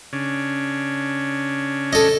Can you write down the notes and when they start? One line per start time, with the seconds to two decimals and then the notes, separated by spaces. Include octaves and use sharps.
0.13 C#3 C#4 D4
1.93 A4 D#5